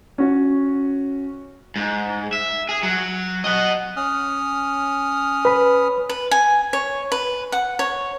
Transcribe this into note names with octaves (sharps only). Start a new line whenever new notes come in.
C#4 F#4 C#5
G#2
E5
G#4
F#3
D#5 F#5
C#4 D#6 F6
B4 B5
B4
G#5
C#5
B4
F#5
C#5